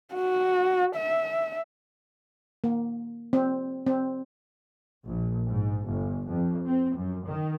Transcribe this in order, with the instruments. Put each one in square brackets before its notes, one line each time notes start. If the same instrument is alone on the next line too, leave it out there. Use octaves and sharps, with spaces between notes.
[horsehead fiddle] F#4
E5
[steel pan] A#3
C4
C4
[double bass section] A#1
G#2
G1
F2
C4
F#2
D#3